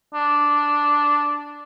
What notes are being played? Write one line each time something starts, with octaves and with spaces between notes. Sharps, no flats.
D4